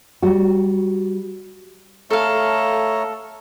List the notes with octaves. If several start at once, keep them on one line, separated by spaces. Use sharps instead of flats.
G3 F#4
A3 A4 C#5 F5 A#5